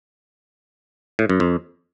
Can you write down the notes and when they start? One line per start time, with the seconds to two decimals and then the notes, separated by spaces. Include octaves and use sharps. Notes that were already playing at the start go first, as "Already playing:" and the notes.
1.19 A2
1.30 F#2
1.40 F2